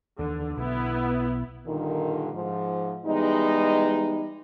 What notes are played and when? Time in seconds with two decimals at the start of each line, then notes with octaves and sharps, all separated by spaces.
0.19 D#2 D3 E3
0.57 B1 B3 E4
1.67 G2 A#2 D3 D#3
2.32 G#2 F3
3.06 E3 G3 G#3 B3 D#4